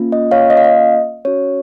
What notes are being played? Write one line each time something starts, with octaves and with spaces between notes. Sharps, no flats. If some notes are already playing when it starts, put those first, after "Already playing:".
Already playing: A#3 C#4 F4
D#5
C#5 F5
D#5
F5
D#5
C#4 F#4 C#5